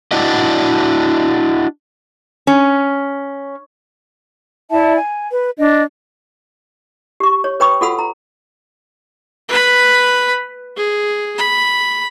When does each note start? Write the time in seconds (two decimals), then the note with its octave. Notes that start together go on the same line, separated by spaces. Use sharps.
0.12 D4 E4 F#4 D5 D#5
2.47 C#4
4.71 E4 D5 E5 A5
4.97 G#5
5.30 B4
5.58 D4 D#5
7.20 G4 C#6
7.44 C#5
7.60 B4 C#5 G5 B5 C#6 D#6
7.81 F4 F#4 A4 F#5 B5 E6
7.99 A#5
9.49 B4 B5
10.77 G#4
11.38 B5